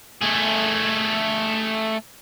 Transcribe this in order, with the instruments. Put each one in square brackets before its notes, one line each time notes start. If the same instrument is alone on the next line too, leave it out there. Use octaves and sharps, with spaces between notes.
[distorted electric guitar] A3 G#4